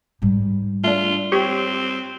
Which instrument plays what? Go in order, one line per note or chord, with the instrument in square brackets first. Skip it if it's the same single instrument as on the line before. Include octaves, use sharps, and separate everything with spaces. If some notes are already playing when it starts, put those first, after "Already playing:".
[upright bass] G#2 G3
[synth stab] A3 D4 [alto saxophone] F4
[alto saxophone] C4 [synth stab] G4 C#5